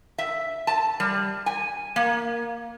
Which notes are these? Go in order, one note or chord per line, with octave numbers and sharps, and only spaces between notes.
E5
A5
G3
G#5
A#3